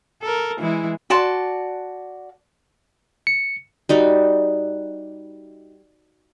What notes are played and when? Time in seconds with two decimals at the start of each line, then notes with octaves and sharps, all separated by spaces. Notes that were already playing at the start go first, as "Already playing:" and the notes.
0.22 A4 A#4
0.59 E3 G#3 E4
1.10 F#4 D5 A5 C6
3.27 C#7
3.89 G3 D#4 F#4